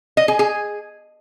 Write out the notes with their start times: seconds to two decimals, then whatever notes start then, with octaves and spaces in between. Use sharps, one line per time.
0.17 D#5
0.28 G#4
0.39 G#4